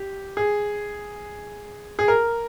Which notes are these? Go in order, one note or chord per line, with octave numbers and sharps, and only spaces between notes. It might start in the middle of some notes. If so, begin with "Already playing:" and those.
Already playing: G4
G#4
G#4
A#4